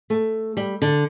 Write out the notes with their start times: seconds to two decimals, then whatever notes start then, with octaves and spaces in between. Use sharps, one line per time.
0.10 A3
0.57 G3
0.82 D3